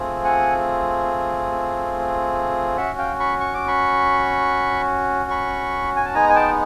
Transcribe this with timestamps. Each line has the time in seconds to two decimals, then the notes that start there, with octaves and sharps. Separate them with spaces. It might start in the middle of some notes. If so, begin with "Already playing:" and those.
Already playing: A3 C4 F4 G#4
0.24 F#5 G#5
2.77 C#4 F#4 E5 F#5
2.98 F5 G5
3.20 B5 C#6
3.40 C#6
3.54 D6
3.68 B5 C#6
5.30 B5 C#6
5.96 G#5
6.05 A5
6.15 G#3 B3 D#4 G#5 A#5
6.29 G#5
6.35 G5 A5